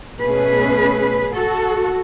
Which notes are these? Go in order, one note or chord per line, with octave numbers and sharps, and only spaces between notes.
B2 A3 C#4 G#4 B4
F#4 A4